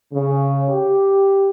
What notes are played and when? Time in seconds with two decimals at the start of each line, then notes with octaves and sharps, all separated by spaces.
0.13 C#3
0.70 G4